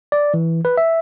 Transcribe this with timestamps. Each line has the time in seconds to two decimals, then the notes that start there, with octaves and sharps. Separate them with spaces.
0.12 D5
0.34 E3
0.65 B4
0.77 E5